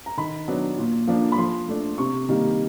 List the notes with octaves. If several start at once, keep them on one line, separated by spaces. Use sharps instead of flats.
A#5
D#3 B5
F#3 B3 D4
A#2
F3 A#3 D4
B5
F3 C6
A3 D4
C3 C#6
D#3 G3 A#3